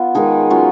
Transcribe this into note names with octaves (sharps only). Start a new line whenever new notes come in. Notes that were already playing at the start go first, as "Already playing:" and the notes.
Already playing: B3 F4
D#3 G#3 D#4 G#4
F#3 C#4 F4